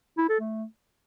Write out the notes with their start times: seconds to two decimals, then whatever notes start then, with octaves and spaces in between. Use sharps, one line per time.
0.18 E4
0.29 A4
0.40 A3